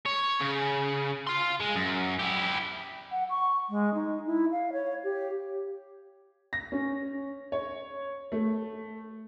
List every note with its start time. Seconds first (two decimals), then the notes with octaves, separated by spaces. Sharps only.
0.06 C#5
0.40 C#3
1.27 F5 C6
1.60 G#3
1.75 F#2
2.19 E4 G4
3.12 F#5
3.30 C#6
3.70 G#3
3.94 D#4
4.27 E4
4.51 F5
4.73 C#5
5.04 G4
6.53 A#6
6.72 C#4
7.52 C#5
8.32 A3